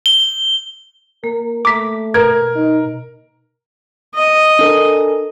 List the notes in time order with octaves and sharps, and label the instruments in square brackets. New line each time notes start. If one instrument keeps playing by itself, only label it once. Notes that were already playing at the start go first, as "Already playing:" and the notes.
[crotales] G7
[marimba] A#3 [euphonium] A#4
[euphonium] A3 [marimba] A#5 [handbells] D6 B6
[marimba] B2 B4 [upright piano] A#4 [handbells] G#6
[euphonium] D#4
[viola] D#5
[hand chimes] D4 A4 A#4